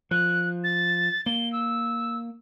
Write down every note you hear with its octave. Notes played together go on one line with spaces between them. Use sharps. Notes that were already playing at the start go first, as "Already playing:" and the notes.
F3 F#6
A6
A#3 G7
E6